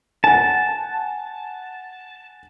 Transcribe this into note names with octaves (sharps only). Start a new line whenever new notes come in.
F#5 G#5 A5